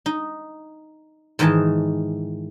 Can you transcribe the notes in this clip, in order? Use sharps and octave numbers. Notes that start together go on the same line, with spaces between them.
D#4
G#2 D#3 E3 D#4 A5